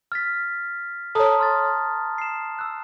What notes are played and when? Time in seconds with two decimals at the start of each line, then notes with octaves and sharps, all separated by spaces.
0.12 F6 A6 B6
1.15 A4 C#5 A5 A#5 D#6
1.39 C6 F6 A6
2.18 C7 E7
2.59 E6 F#6